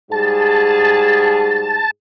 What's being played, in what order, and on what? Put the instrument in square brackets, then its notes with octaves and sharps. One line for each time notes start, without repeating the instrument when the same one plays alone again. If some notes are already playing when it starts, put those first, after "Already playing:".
[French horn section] G#2 G3 G#4 [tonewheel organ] A5